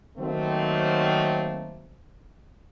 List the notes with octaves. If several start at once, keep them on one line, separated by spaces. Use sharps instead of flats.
D#3 F#3 A3 A#3 C4